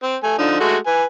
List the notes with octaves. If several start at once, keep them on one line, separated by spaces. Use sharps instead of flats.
C4
A3 G#5
D3 F3 D#4
G#3 A3 F#4
B4 G#5